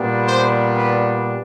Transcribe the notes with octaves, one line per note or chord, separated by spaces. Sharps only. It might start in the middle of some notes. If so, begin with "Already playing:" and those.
Already playing: A#2 G3 B3 D4
C5
B4